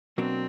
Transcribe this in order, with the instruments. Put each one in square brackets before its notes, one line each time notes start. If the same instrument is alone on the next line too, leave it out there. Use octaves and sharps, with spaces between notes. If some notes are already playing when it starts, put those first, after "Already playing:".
[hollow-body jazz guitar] B2 F#3 A#3 D4 F#4 [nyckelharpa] C4